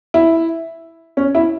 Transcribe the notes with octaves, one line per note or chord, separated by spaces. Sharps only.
E4
C#4
E4